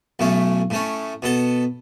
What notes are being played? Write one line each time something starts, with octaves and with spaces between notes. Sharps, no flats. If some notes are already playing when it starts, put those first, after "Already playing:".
B1 A2 A3 C#4
A2 A3 C#4
B2 B3 A4